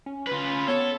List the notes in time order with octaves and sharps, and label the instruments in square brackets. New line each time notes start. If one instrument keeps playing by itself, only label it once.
[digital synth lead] C#4
[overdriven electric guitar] F4 B4
[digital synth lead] B3 [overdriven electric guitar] A4 [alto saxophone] C#5